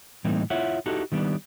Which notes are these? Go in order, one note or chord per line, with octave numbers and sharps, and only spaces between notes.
A2 E3 G3 A#3 C4 D#4
E4 F4 C#5 E5 F#5
D#4 E4 F#4 G4 A4
D#3 G3 B3 D4